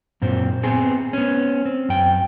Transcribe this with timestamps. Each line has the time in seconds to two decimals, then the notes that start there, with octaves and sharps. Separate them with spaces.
0.22 F#2 A#2 C4
0.63 B3 C4 G#4
1.13 B3 C#4
1.65 C4
1.89 F#2 G5